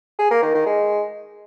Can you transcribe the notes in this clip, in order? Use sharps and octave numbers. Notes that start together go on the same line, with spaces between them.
G#4
A#3
D#3
D#3
G#3